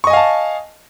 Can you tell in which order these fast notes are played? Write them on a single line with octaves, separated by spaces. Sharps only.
C#6 D#5 G#5 F5 A5